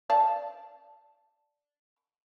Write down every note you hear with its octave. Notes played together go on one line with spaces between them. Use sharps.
D5 F5 A5